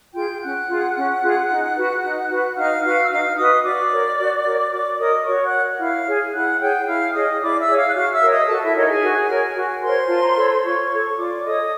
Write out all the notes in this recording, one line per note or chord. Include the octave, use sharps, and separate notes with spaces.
F4 G#4 G5 G6
C#4 F#5 F#6
F4 G#4
C#4
F4 G#4
D#4
F#4 B4
D#4
F#4 B4
D#4 F5 F6
F#4 B4 F5 F6
E6
D#4 F5 F6
F#4 B4 D#5 D#6
F#4 D5 D6
A#4 C#5
F#4
A#4 C#5
F#4 D5 D6
A#4 C#5 D#5 D#6
F#4 C#5 C#6
F#5 F#6
A#4 C#5
E4 F5 F6
G#4 C#5
E4 F#5 F#6
G#4 C#5 G5 G6
E4 F5 F6
G#4 C#5 D#5 D#6
E4 D5 D6
E5 E6
G#4 C#5
F5 F6
F#6
F#4 F5 F6
E5 E6
A#4 C#5
D#5 D#6
F#4 A4 A5
E4 E5
D#4 A#4 C#5 D#5
G#4 G#5
F#4
A#4 C#5
F#4
A#4 C5 C#5 C6
F4 A5
A#5
A4 C#5 B5
C6
F4 C#5 C#6
A4 C#5
F4 D5 D6
A4 C#5 D#5 D#6